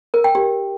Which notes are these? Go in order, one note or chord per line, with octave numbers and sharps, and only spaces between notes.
A#4
G5
G4